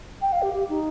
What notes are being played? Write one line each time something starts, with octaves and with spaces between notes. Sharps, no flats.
G5
F5
G4
G4
D#4